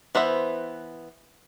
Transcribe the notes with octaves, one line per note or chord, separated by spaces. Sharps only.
E3 B3 C5 E5